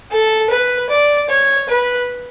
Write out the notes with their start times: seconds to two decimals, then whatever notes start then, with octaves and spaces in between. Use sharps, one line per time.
0.12 A4
0.51 B4
0.90 D5
1.30 C#5
1.69 B4